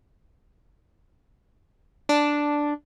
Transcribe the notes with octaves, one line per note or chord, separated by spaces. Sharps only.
D4